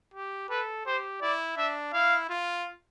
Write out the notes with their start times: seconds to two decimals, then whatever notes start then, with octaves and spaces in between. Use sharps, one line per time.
0.14 G4
0.50 A4 B4
0.86 G4 C5
1.22 E4 D5
1.57 D4 E5
1.93 E4 F5
2.29 F4